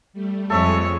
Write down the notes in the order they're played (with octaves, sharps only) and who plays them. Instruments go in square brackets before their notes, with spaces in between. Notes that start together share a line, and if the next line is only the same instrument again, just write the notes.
[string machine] G3 A3
[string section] F2 G#3 [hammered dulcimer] A4 E5 [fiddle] C#5